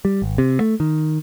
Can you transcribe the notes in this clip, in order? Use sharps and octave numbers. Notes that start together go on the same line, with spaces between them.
G3
G#1
C3
A3
D#3